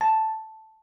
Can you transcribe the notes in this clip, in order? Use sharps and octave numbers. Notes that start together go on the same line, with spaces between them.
A5